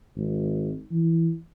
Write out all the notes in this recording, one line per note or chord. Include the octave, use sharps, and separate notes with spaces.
G#1
E3